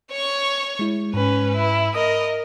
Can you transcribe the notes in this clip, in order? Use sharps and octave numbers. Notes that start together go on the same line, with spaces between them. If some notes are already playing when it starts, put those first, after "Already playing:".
C#5 C#6
G#3 E4
G#2 C#4 B4
E4
A#4 D#5 D#6